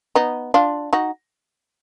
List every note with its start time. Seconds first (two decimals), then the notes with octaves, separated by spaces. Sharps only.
0.15 B3 D#4
0.54 D4 F4
0.93 D#4 F#4